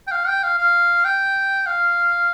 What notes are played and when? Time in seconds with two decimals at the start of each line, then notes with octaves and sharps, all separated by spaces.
0.08 G5
0.11 F5
0.28 G5
0.43 F5
0.58 F5
1.05 G5
1.67 F5